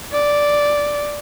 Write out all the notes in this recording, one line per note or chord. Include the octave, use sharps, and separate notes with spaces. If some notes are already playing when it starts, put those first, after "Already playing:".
D5